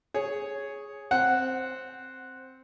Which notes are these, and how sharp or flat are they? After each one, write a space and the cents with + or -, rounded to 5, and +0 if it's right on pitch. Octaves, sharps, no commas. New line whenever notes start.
G#4 +0 C#5 +0
C4 +0 F#5 +0